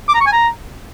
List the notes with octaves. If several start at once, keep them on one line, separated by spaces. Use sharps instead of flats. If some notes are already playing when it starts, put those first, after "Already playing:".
D6
A#5
C#6
G#5
A#5